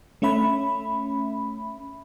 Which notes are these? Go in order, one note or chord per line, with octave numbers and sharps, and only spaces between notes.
A3 C#4 E5 B5